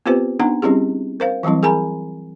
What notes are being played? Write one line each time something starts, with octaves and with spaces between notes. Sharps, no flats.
B3 C4 F4 G4 B4 C5
B3 D4 D#4 F#5 A#5
G3 C4 C#4 E4 G4 G#4
A#4 C5 F5
E3 F#3 G3 C4 E4
G#4 A#4 G#5 A#5 B5